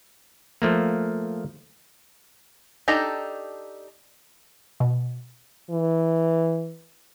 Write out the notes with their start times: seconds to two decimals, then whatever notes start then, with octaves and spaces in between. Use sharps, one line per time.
0.62 F3 A3 A#3
2.88 D4 D#4 G4 A4 A#5
4.80 B2
5.70 E3